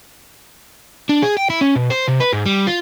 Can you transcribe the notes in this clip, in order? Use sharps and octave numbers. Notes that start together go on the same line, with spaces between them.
D4
G#4
G5
E4
C#4
B2
C5
C3
B4
G#2
G3
F4